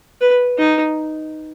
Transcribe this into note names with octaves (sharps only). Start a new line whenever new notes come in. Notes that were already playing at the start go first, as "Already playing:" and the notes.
B4
D#4